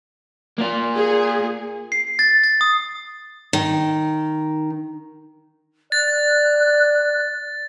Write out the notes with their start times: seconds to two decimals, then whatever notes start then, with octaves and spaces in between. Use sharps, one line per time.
0.58 A#3 F4
0.95 G#4
1.92 C7
2.19 A6
2.44 A6
2.61 D#6
3.53 D#3
5.92 D5 F#6 A6